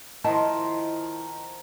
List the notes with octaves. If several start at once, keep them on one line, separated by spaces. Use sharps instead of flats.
D#3 F3 E4 D#5 A5